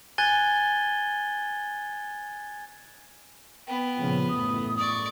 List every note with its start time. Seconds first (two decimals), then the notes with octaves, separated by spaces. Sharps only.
0.18 G#5 F#6 G#6 A6 D#7 G7
3.68 B3 G5
3.98 A#2 C#3 F3
4.29 A1 F#2 A2 D#6
4.77 D5 C#6